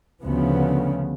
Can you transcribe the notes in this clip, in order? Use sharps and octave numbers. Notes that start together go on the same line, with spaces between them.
D2 C#3 F3 B3